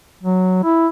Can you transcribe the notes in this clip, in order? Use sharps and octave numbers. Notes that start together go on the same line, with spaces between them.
F#3
E4